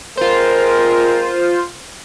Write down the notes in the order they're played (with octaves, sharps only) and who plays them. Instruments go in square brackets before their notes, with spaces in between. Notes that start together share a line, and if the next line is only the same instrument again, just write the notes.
[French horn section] G#3 C4 A#4 [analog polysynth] F4 C5